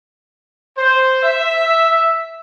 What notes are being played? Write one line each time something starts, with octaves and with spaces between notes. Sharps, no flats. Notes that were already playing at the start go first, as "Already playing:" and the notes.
C5
E5